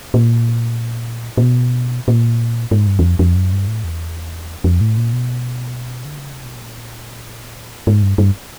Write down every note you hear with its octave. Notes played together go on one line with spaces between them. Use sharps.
A#2
A#2
B2
A#2
G#2
G2
E2
F2
F2
F#2
G2
A2
E2
F2
A2
A#2
B2
D3
C#3
C3
B2
A#2
G#2
G2
G2